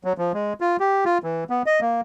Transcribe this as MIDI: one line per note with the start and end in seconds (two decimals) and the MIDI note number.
0.04 0.13 54
0.18 0.32 53
0.34 0.53 56
0.61 0.77 65
0.80 1.05 67
1.05 1.18 65
1.23 1.44 52
1.50 1.63 59
1.66 1.80 75
1.81 2.01 58